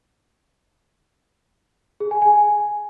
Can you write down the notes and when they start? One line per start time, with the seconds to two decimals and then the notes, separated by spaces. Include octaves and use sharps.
2.00 G#4
2.11 G#5
2.22 G#5